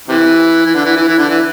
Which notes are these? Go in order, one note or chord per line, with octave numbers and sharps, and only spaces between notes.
C3 E3
E3
D3
E3
E3
E3
D3
E3